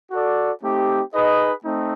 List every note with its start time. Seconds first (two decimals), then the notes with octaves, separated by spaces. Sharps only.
0.11 F#4 A4 D5
0.62 A3 C4 D#4 G4
1.12 D#4 G#4 B4 D#5
1.64 A3 C4 D#4